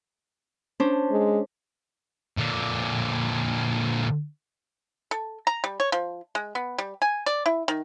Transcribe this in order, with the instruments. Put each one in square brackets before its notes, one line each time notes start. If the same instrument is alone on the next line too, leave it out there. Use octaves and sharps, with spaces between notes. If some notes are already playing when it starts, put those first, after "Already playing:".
[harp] C#4 D4 C5
[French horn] G#3
[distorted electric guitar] A#2 D3
[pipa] A4
A#5
G3
C#5
F3
G#3
B3
G3
G#5
D5
E4
D#3